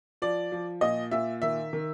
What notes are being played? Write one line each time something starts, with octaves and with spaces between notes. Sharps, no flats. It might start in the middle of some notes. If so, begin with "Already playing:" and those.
F3 D5
F3
A#2 D#5
A#2 E5
D#3 E5
D#3